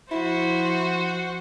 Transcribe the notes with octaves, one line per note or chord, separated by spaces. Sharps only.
F3 E4 F#4 C5